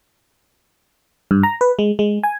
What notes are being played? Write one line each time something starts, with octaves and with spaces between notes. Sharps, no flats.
G2
A#5
B4
G#3
G#3
G#5